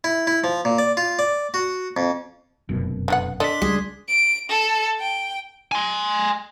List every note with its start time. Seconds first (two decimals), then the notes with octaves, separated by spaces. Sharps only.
0.04 E4
0.27 E4
0.44 F3
0.65 A#2
0.78 D5
0.97 F4
1.19 D5
1.54 F#4
1.97 F2
2.69 F1 F#2 B2
3.08 D3 B3 F#5
3.40 D4 A4 D#5 C6 B6
3.62 C#2 G3 G#4
4.09 D7
4.49 A4
5.00 G5
5.72 G#5 C6